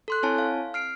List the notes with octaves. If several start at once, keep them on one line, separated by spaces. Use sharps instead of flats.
A4 C6 F#6
C4 E4 C#5 G#5 A5
F5
F6 C7 D7